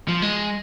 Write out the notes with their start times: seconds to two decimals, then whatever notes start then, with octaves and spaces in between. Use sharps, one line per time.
0.08 F3
0.22 G#3